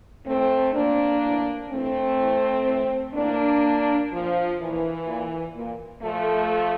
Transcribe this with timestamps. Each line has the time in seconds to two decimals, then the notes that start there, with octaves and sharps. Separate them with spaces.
0.26 A2 E3 A3 C4
0.74 A#2 A#3 D4
1.22 A2 E3
1.70 A2 E3 A3 C4
2.18 A2 E3
2.66 A2 E3
3.14 A2 E3 A#3 D4
3.62 A#2
4.10 A#2 F3
4.58 A#2 E3
5.07 A#2
5.55 A#2
6.02 A#2 F3 A3